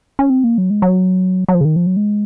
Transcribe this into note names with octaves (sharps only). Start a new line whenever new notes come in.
C#4
C4
A#3
F#3
G#3
F#3
F#3
F3
C#3
D#3
F3
F#3
G#3